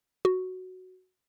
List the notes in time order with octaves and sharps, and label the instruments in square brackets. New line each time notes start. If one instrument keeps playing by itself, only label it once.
[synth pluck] F#4